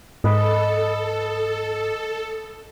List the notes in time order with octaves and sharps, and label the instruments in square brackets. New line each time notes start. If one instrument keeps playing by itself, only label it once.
[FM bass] G#2 [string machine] A4 [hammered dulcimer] B4 D#5